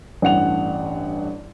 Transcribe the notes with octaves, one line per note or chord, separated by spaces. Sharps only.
A1 G2 F#5 F7